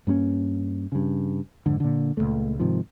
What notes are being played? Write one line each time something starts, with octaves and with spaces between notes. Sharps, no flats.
G2 A#3 B3 C#4
G2 C#3
F2 G#2 D3
A#2 D3
C#2 G2 A#2 A3
G#2 C3 D#3 F3